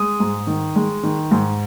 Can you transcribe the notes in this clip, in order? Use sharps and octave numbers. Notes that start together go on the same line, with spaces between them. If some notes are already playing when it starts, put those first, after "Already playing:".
Already playing: G#3 D#6
G#2
D#3
G#3
D#3
G#2